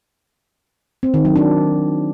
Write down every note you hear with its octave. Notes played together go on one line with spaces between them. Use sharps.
C4
D#3
F#3
D4